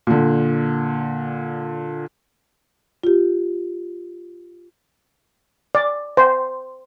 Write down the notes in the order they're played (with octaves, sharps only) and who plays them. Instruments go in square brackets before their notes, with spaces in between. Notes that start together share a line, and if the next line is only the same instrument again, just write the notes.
[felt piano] A#2 D3
[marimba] F4 G4
[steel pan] D5
C5